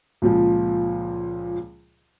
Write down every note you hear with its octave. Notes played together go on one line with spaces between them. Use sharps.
C#2 A#2 F3